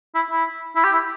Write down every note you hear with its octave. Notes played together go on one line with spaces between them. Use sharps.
E4
E4
E4
G4
E4